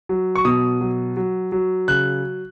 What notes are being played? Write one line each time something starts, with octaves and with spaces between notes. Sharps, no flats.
F#3
C#6
B2 D#6
F#3
F#3
F#3
C#3 F#6